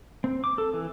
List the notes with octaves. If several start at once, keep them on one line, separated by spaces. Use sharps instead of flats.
C4
D6
A4
E3